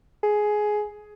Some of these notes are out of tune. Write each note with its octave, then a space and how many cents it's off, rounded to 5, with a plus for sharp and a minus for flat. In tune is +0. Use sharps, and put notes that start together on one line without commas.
G#4 +10